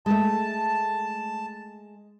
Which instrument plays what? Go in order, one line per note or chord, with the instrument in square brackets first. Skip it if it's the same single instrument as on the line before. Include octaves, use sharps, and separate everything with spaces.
[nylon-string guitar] G#3 A3 [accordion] A5